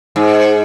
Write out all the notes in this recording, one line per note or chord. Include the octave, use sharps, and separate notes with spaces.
G#2